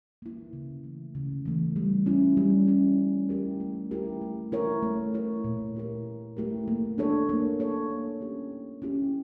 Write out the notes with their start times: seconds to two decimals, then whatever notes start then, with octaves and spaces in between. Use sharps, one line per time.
0.22 A#3 E4
0.53 C#3
0.83 E3 A3
1.15 C#3
1.46 E3 A3
1.76 G3
2.06 C#4 E4
2.37 G3
2.68 C#4 E4
2.98 A3
3.29 E4 G4 A#4
3.60 A3
3.91 E4 G4 A#4
4.21 A3
4.52 E4 A#4 C#5
4.83 A3
5.14 E4 A#4 C#5
5.44 A#2
5.75 A3 E4 G4 A#4
6.06 A#2
6.37 A3 E4 G4 A#4
6.68 A#3
6.98 D4 A4 C#5
7.29 A#3
7.59 D4 A4 C#5
7.90 A#3
8.21 C#4 E4 G4
8.51 A#3
8.82 C#4 E4 G4